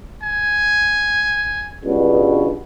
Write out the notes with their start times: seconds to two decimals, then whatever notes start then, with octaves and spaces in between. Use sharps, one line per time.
0.23 G#5
1.84 C#2 G2 B2